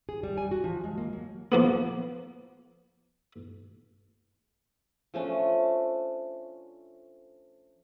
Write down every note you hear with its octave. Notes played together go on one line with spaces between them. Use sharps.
G#4
G3
G#5
F#4
F3
G#3
A#3
F#3
F3 A#3 B3
F3 A3 C#4 D4